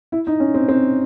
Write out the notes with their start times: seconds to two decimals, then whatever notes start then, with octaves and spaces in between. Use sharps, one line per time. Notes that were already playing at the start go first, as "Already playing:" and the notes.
0.12 E4
0.27 D#4
0.40 C#4
0.54 C4
0.69 C4